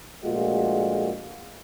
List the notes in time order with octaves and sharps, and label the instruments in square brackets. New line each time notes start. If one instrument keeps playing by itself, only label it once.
[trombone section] A#1 A#2 G#3 A3 F4 F#4